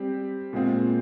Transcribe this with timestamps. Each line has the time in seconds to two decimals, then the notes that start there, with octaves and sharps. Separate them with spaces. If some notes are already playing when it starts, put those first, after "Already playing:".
Already playing: G3 C4 G4
0.53 A#2 G#3 C4 F4